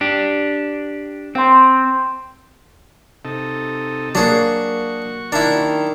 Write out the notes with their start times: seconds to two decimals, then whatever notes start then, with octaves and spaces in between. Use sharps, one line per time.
0.01 D4 G4
1.35 C4 G5 C6
3.25 C3 D#4 A4
4.15 F#3 A#3 D4 F#4 G#4 C#6
5.32 D#3 D4 E4